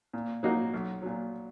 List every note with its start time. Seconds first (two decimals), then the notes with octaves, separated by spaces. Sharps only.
0.13 A#2
0.43 F#3 A#3 D#4 F#4
0.74 B1
1.02 A#2 F#3